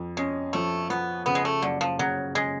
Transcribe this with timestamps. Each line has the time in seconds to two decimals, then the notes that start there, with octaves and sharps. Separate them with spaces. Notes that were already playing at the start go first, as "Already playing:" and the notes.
Already playing: F2
0.17 G#3 C#4
0.53 F3 A3
0.89 F3 B3
1.26 C#3 B3
1.35 G#3
1.45 A3
1.62 F#1 D3
1.81 F3
1.99 C#3 F#3
2.35 C#3 G#3